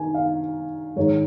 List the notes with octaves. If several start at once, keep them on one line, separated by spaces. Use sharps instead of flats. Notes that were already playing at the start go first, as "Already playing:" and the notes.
Already playing: D#3 G#5
F5
G#2 D#3 C#5